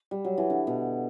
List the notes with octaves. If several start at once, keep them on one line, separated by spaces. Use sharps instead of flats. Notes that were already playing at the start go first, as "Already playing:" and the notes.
Already playing: A3
G3
F#3
E3
D3
B2